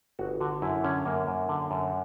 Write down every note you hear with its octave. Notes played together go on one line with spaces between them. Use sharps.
G1 F#4
D3 F#4
F#2 E4
D3 C#4
F#2 A#3
F#2
D3
F#2